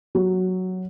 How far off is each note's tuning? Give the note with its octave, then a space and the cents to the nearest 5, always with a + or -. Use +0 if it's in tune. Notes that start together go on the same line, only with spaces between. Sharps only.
F#3 +0